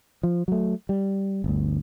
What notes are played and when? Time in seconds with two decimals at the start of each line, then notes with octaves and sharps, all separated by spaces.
0.23 F3
0.48 F#3 A3
0.89 G3
1.44 G1 D2